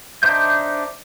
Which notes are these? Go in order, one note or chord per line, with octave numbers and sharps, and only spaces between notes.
D4 D#4 C5 E5 G6